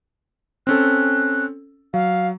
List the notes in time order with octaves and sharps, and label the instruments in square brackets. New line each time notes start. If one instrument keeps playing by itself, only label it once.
[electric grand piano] C4 C#4 A4 [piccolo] F#6
[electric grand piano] F#3 [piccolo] F5